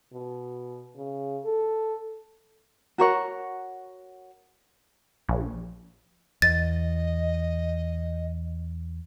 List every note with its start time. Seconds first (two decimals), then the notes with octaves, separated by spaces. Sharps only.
0.13 B2
0.96 C#3
1.45 A4
2.98 F#4 A#4 C#5 F#5
5.29 A#1
6.42 E2 D#5 A6